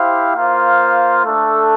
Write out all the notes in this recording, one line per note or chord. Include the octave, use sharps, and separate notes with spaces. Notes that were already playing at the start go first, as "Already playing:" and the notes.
Already playing: E4 G4 C5 F5
A#3 F4 C5 F5
A3 D4 A4